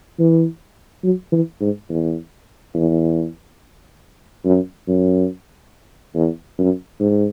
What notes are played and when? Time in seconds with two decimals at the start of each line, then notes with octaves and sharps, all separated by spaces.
0.19 E3
1.04 F#3
1.32 E3
1.61 G#2
1.89 E2
2.74 E2
4.45 F#2
4.88 F#2
6.15 E2
6.58 F#2
7.00 G#2